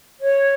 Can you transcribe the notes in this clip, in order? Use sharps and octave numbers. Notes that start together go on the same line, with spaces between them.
C#5